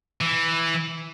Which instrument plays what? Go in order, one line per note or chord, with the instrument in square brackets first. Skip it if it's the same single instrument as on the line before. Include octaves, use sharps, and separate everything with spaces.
[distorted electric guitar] E3